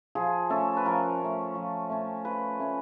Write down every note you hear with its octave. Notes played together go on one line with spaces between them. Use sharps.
F3 G#4
A3 C#4 A4
B4
F3 A#4
A3 C#4
F3
A3 C#4
F3 B4
A3 C#4